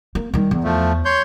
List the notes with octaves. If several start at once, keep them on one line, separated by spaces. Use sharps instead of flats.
A#3
D#3 G3
E2
F3 A3
C#5 C6 G6